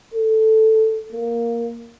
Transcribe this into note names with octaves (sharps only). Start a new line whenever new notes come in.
A4
A#3